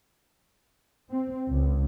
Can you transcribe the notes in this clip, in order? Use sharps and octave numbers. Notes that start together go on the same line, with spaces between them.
C4
C#2